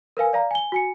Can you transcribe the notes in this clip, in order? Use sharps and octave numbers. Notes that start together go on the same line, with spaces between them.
A#4 B4 F5 G#5
D5 F5 A#5
G#5 G7
F#4 G#5 C#7